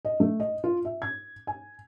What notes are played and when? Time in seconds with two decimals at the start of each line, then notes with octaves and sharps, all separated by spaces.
0.05 D#5
0.20 A3
0.40 D#5
0.64 F4
0.85 E5
1.02 G#6
1.47 G#5